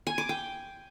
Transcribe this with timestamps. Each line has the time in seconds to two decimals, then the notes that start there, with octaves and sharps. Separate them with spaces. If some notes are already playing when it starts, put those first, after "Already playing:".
0.07 G#5
0.18 D6
0.29 G5